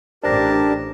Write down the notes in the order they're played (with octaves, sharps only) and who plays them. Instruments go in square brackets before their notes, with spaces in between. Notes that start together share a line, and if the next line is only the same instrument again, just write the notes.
[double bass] A1 [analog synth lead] D4 [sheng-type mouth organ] G4 A#4 A5 [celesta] C5 A#6